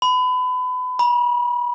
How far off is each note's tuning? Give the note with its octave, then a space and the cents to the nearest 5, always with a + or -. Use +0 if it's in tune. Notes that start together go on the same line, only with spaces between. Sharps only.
B5 +30
B5 -35